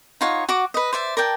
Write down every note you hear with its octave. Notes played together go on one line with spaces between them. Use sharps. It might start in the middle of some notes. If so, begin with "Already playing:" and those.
D#4 F4 C#5 F#5
F#4 F#5 D6
B4 D#5
C5 D5 E5
A#4 D5 G5 A5